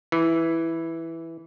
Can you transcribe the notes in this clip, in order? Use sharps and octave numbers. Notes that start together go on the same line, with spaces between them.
E3